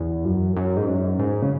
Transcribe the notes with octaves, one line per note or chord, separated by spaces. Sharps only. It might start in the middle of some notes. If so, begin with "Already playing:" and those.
Already playing: E2
F#2
F#2
G#2
F#2
G#2
C#3